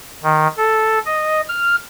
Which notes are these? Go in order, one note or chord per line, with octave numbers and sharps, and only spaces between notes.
D#3
A4
D#5
F6